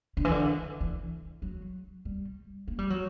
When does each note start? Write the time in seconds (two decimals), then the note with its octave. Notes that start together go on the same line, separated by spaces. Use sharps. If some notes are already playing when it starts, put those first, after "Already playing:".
0.17 D3
0.25 E3
0.31 D3
0.81 E3
1.42 F#3
2.05 G3
2.68 A#3
2.78 G3
2.90 F#3